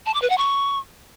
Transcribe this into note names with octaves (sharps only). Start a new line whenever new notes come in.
A5
D6
B4
F#5
C#6